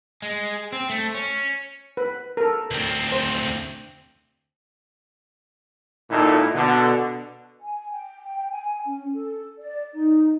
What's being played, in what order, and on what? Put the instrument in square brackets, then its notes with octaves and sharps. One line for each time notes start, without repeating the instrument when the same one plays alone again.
[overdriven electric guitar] G#3
C4
A3
C#4
[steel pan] B4
A4 A#4
[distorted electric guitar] D2 C4
[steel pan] C5
[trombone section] G#1 A#2 D#4 E4 A4
B2 D3
[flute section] G#5
G5
G#5
C#4
A4
D5
D#4